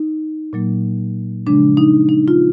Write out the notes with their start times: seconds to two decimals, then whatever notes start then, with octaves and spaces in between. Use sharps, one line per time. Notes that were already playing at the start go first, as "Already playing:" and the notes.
Already playing: D#4
0.53 A#2 F#3 A#3
1.47 C#3 F3 G#3 D4
1.77 D#4
2.09 D#4
2.28 F4